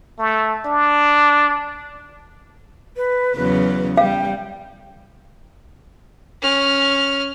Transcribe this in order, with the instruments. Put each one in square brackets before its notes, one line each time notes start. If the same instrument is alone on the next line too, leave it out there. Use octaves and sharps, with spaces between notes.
[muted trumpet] A3
D4
[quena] B4
[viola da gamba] E2 C#3 F#3 [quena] B4
[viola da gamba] G3 [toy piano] F5 [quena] G5
[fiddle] C#4 F6